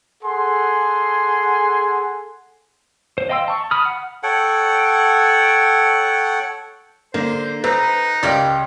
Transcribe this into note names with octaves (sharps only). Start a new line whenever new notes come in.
G#4 A4 F#5 G#5 C6
C5
D#5 F5 G5 C6 E6
A5 C#6
B5 D#6 F6
F#5
A4 C#5 F#5 G5
D3 A#3 C5
C4 D#4 B4 A#5
C#2 A#3 G4 C#5 D5 G5